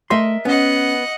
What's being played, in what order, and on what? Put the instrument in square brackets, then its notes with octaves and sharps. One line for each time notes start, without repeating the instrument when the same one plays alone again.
[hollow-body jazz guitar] A3 C6 [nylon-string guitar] A#4 D#5 E5
[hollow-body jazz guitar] B3 [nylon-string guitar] C#4 [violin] D#5 F#5